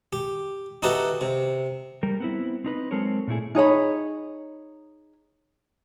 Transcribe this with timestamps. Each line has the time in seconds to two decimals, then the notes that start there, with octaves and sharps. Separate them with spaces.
0.13 G4
0.83 D#4 E4 F#4 G4 A4 B4
1.21 C3
2.03 G3 A#4
2.20 B3 C4 E4
2.64 C4 D#4 B4
2.91 F#3 G#3 C4 A4 A#4 C#5
3.28 A#2 A3 E4 G#4
3.55 D#4 G#4 C#5 B5